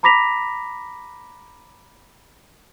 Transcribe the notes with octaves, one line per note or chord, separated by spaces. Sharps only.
A#5 B5 D6 A#6 B6 F7